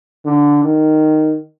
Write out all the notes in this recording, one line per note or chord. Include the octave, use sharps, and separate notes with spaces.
D3
D#3